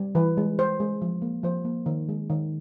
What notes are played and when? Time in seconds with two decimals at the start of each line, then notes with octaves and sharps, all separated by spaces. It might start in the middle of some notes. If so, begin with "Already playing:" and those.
Already playing: G3
0.15 E3 B4
0.37 G#3
0.58 G#3 C5
0.80 G#3
1.02 F3
1.22 A#3
1.43 F3 C5
1.65 A#3
1.86 D#3
2.09 G#3
2.30 D#3